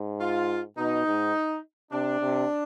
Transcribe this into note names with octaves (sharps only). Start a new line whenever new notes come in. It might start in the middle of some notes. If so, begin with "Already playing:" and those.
Already playing: G#2
F4
B2 D#4
G#2
C3 D4
C3